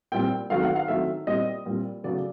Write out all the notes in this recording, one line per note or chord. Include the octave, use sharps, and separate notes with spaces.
A#2 G3 C4 G5
D#3 F#3 A3 C4 F5
F#5
F5
D#3 F#3 A3 C4 E5
A#2 G3 C4 D#5
A#2 G3 C4
C#3 F#3 A3 D5